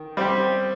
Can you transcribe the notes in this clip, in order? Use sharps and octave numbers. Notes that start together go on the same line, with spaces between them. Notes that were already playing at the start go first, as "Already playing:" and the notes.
Already playing: D#3
G3 C4 G4